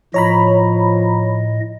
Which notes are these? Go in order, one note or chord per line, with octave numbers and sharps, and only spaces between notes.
A2 F3 C#5 D#5 A#5 B5